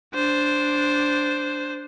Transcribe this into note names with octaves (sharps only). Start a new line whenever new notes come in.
D4 C5